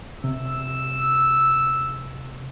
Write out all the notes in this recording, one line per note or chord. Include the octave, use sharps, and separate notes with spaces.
C3 E6